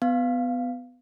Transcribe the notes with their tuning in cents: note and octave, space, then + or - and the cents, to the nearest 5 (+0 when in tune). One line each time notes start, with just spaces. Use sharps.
B3 +20 F5 +0